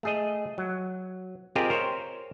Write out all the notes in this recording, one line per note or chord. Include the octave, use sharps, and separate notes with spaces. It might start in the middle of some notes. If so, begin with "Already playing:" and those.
A3 G#4 D#5
F#3
C4 F4 G4 G#4 A#4 D#5
A#4 C5 C#5